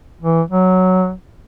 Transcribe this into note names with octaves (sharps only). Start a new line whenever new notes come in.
E3
F#3